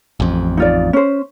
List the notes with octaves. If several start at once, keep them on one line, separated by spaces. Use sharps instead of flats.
A1 F2
D#4 F4 D5
C#4 C5